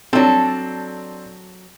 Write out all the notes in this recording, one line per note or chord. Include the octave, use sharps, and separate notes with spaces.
F#3 C4 D4 A4